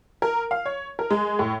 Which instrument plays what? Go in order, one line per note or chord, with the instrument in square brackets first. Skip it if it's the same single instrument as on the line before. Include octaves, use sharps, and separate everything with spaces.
[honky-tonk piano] A#4
F5
C#5
A#4
G#3
A2